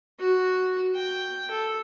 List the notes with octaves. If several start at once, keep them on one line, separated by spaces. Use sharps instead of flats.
F#4
G5
A4